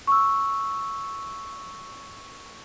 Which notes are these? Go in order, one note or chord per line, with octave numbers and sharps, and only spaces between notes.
C#6 E6